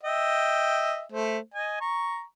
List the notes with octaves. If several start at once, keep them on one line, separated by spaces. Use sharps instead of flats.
D#5 E5 G5
A3 C5
D#5 G#5
A#5 C#6